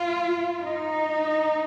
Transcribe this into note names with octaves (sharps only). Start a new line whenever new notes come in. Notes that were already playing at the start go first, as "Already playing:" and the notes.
Already playing: F4
D#4